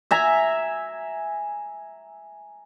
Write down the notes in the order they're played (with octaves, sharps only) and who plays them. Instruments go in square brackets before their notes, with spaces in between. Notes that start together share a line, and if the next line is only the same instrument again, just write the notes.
[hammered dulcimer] E5 G#5 A#5